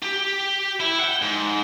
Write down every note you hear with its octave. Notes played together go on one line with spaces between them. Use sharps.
G4
E4
F#5 G5
G#2